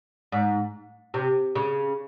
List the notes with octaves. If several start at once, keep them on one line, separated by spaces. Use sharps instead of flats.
G#2
C3
C#3